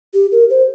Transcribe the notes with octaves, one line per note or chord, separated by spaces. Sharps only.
G4
A#4
C5